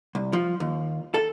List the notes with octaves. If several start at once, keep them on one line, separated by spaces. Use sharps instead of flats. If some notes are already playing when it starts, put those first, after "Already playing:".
C2
F3
D#2
A4